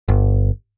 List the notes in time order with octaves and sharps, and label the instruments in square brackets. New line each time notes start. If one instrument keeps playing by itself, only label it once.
[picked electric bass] G1